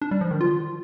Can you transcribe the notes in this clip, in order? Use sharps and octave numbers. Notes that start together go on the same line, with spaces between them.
D4
G3
F3
D#3
F4